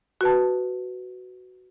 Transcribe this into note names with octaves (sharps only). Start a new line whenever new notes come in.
F#4 B4 A5